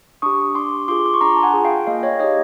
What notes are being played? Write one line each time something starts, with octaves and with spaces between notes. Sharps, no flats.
D4 G4 C#6 D#6
D4 C6 D6
F4 G#4 C6 D6
D6
C#6
D4 A#5 C6
A5
F#5 G#5
F4 G#4
F5 G5
A#3 D#5 F5
C#5 D#5
D#4 G4 C#5 D#5